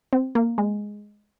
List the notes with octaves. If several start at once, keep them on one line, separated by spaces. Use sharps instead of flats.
C4
A#3
G#3